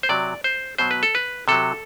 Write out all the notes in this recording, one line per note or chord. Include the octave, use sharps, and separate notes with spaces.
C5
C3 F#3 D5
C5
B2 F#3 C5
B4
A4
B4
C3 F#3 A4